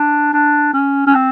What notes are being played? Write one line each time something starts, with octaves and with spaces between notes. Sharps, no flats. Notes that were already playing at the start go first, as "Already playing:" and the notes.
Already playing: D4
D4
C#4
C#4
C4